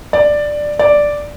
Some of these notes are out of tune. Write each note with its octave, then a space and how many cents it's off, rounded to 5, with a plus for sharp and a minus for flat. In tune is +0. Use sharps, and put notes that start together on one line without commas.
D5 +10
D5 +0